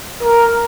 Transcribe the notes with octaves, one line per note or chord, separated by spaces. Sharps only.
A#4